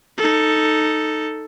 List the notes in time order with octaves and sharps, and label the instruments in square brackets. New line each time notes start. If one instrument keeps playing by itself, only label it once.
[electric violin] D#4 A4